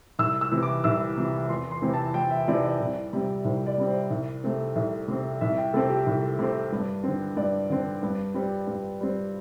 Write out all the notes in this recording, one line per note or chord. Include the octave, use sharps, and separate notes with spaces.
C2 E6
E6
C3 E3
D6
C2 E6
C3 E3
E2 C6
C6
C3 E3 C4
A5
E2 G5
E5
C3 E3 C4 D5
D5
C2
C3 G3 C4
C2 C5
D5
C3 G3 C4
C5
C2
C3 A3 C4
C2
C3 A3 C4
C2 E5
G5
C3 A3 C4 A4
G4
C2
C3 A3 C4
G2
D3 C4
G2 D5
D3 C4
G2
G3 C4
G2
G3 C4